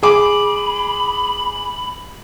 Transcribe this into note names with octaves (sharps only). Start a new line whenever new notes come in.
G#4 B5 D6